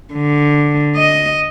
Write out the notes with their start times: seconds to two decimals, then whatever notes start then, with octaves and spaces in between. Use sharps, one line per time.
0.14 D3
0.96 D#5